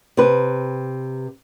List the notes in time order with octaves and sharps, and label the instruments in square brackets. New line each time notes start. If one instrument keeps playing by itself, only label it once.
[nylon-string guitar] C3 B4